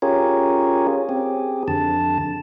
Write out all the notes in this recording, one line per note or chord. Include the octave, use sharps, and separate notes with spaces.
C#4 F4 G4 G#4 A#4 C#5
C4 G4 G#4
F2 D3 A5